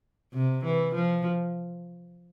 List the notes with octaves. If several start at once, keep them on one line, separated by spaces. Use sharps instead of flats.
C3
E3
F3